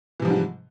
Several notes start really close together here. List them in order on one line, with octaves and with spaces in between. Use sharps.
E3 C3 F3 G3 G#2